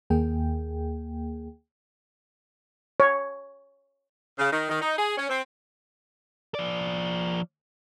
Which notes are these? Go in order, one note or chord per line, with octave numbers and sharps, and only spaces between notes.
D#2 A#3 G#4 G5
C#5
C#3
D#3
D#3
D#4
G#4
C#4
C4
F3 D5